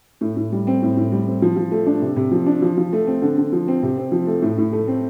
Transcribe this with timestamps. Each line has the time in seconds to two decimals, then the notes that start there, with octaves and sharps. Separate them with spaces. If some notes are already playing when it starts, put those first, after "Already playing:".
0.21 A2
0.37 A2
0.52 G3
0.67 C4
0.82 A2
0.97 A2
1.12 G3
1.27 C4
1.42 F3
1.56 F3
1.71 A3
1.86 D4
2.01 C3
2.16 C3
2.31 F3
2.46 D4
2.62 F3
2.77 F3
2.93 A3
3.07 C4
3.22 D3
3.38 D3
3.52 F3
3.68 C4
3.83 C3
3.98 C4
4.12 F3
4.27 A3
4.42 A2
4.58 A2
4.73 A3
4.88 C4